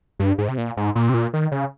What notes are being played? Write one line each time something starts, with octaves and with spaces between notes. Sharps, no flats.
G2
G#2
C3
A#2
G#2
A#2
C3
A#2
D#3
C#3